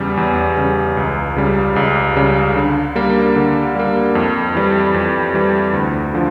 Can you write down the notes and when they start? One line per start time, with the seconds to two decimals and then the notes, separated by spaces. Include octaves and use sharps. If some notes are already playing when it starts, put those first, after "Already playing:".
Already playing: E2 C#3 G3
0.17 E2
0.57 C#3 G3
0.97 C#2
1.36 C#3 G3
1.76 C#2
2.16 C#3 G3
2.56 D3
2.95 G3 A#3
3.36 D3
3.75 G3 A#3
4.15 F2
4.55 E3 G3
4.94 F2
5.34 E3 G3
5.73 D2
6.14 D3 F3